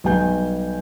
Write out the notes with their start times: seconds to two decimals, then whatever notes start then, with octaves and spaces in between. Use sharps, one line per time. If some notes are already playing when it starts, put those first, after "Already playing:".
0.04 B1 G3 B4 G#5 G6